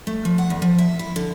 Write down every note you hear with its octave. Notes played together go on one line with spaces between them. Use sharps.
A3
F3
F#5
E2
F3
E5
E4
D3